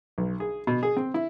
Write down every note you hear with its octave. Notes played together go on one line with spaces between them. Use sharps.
B1
G#4
B2
G#4
C4
E4